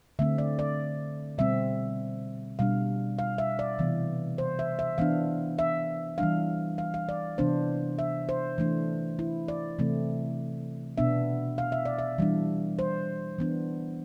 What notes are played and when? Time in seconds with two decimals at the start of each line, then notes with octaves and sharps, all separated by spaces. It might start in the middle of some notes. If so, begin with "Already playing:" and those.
0.19 D3 A3 C4 E5
0.38 D5
0.59 D5
1.38 B2 G3 C4 E5
2.59 B2 G3 D4 F5
3.19 F5
3.38 E5
3.59 D5
3.79 C3 E3 B3
4.38 C5
4.59 E5
4.79 E5
4.98 E3 B3 D4 F5
5.59 E5
6.18 E3 G3 D4 F5
6.78 F5
6.94 F5
7.09 D5
7.38 C3 E3 B3 D4 C5
7.99 E5
8.29 C5
8.58 E3 A3 D4
9.19 E4
9.48 D5
9.79 C3 E3 A3 C4
10.98 B2 B3 D4 E5
11.58 F5
11.72 E5
11.85 D5
11.99 E5
12.18 E3 G3 D4
12.79 C5
13.39 E3 B3 D4